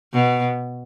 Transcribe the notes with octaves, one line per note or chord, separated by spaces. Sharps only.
B2